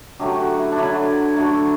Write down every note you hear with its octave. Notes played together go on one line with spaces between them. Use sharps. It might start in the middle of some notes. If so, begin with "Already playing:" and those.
D3 F#3 A3 G4
F#4
E4
D4
D3 F#3 A3 E4
D3 F#3 A3